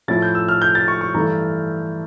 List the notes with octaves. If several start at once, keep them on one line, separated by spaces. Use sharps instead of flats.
A2 F3 A3 C#4 E4 A6
G6
E6
F6
G6
A6
C#6
C#6
G2 E3 A3 A#5